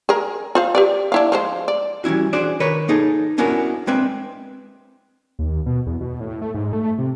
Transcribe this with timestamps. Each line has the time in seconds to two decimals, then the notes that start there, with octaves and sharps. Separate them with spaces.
0.09 G#4 A#4
0.55 F4 C5 F5
0.75 G4 B4 D5
1.12 D4 E4 F5
1.32 F3 G#3 C5
1.68 D5
2.04 E3 G3 C#4 E4 F#4
2.33 D4 F#4 G#4 C5 D5
2.60 D#3 A#4 B4 C#5
2.88 A#3 D#4 G#4 A4
3.38 B3 C#4 D4 E4 F#4 A#4
3.87 G#3 C4 D4 B4 E5
5.39 D#2
5.66 B2
5.86 E2
6.01 B2
6.21 A2
6.42 A3
6.54 G#2
6.73 A3
6.98 C3